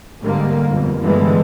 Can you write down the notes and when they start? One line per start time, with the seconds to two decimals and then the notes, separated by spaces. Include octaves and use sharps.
0.22 G#2 D3 G3 G#3 A#3
0.65 G1 F2 B2
1.03 G2 B2 D3 E3 G3 G#3